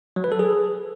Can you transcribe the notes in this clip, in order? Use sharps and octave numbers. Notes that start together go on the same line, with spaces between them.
F#3
B4
A4
G#4